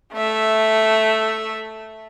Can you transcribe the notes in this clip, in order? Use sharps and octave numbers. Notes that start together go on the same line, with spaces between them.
A3 E5